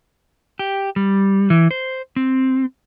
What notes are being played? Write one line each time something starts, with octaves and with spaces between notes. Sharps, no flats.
G4
G3
E3
C5
C4